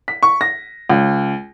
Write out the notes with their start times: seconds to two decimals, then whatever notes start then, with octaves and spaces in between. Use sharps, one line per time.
0.08 B6
0.23 C#6
0.41 A#6
0.90 C#2